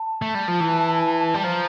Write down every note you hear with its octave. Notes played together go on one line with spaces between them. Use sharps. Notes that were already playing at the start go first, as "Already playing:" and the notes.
Already playing: A5
A3
G3
F3
E3
G3
F3 A#5